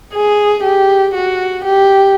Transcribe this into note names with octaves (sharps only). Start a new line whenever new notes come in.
G#4
G4
F#4
G4